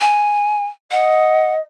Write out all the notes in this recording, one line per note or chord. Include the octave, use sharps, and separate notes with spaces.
G#5
D#5 F#5